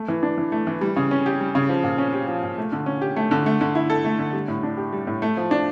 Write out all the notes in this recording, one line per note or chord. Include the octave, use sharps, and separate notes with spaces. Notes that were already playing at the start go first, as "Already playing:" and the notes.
Already playing: A3
E3
D4
E3
A3
E3
G3
C#3
C#4
G4
G3
C#3
F3
A#2
C#4
G4
F3
A#2
A3
D3
C#4
G4
A3
D3
A3
D3
E4
A4
A3
D3
G3
A2
D4
G4
G3
A2
A3
F3
D4